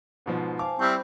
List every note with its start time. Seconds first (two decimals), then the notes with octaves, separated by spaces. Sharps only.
0.26 G#2 B2 F3
0.59 C5 F5 G#5 A5 D6
0.79 G3 C4 E4 C5 G5 B5 C#6 D6